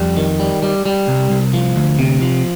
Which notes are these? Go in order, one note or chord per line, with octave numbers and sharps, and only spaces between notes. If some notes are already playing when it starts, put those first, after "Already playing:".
Already playing: F2 G3
D#3
G3
G3
G3
C2
C2
F3
D2
C3
F3